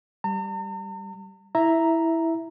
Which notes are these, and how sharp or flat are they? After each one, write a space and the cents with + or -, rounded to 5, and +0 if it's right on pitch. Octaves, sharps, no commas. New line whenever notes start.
G3 +0 A#5 -45
E4 -5 E5 +0 A#5 +0